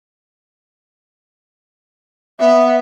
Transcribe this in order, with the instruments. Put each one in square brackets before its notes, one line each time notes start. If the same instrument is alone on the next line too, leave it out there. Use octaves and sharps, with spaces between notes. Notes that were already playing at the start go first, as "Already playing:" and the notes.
[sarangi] B3 [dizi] E5